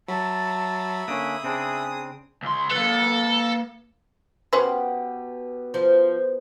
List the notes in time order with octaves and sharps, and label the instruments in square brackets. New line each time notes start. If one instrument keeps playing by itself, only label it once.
[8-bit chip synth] F#3 [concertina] E5 B5 [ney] A5
[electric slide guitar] D3 A#3 D4 [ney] C#4 [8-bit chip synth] D#6
[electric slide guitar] C#3 C4 D4 [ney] G#4
[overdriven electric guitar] C#2 C6
[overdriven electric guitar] A#3 B4 [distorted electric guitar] A4
[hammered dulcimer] B2 B3 G4 [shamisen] C#4 B4 C5
[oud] F3